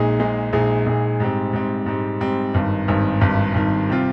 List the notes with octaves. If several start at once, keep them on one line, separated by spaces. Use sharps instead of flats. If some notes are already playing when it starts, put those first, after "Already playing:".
Already playing: A#1 A#2 G#3 D#4 G#4
A#1 A#2 G#3 D#4 G#4
A#1 A#2 G#3 D#4 G#4
A#1 A#2 G#3 D#4 G#4
G#2 G3 C4
G#2 G3 C4
G#2 G3 C4
G#2 G3 C4
G#1 G2 D#3
G#1 G2 D#3
G#1 G2 D#3
G#1 G2 D#3
C3 G3 C4 F4